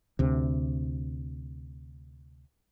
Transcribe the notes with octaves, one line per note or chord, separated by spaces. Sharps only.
D2 C3